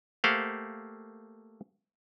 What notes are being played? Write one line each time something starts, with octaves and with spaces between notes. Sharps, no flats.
A3 A#3 G4 C5 F5 F#5